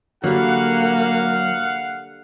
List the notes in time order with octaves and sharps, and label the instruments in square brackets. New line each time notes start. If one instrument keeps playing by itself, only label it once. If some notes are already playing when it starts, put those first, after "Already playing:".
[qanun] D3 G3 [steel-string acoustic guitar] F#3 [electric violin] A#3 [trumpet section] F5 F#5